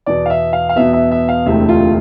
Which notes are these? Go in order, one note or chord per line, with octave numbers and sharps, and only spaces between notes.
E2 B2 B3 D5
F5
E5
F5
F5
E2 B2 B3 E5
E5
E5
F5
E1 D2 C3 E3 A3 E5
F4